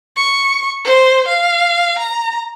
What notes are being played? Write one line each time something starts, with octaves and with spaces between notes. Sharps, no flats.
C#6
C5
F5
A#5